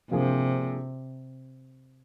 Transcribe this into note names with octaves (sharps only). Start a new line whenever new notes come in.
G2 C3 F3 A#3 F4 G#4